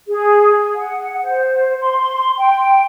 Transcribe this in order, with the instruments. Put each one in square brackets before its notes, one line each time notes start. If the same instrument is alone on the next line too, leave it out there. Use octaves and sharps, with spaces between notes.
[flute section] G#4
F#5
C5
C6
C6
G5